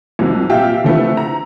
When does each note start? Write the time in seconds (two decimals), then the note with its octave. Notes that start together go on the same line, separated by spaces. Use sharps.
0.19 C2 F2 G#2 C3 F#3
0.50 A#2 G4 E5 F5 G5
0.84 D3 F3 A3 C4 E4 B4
1.17 A#5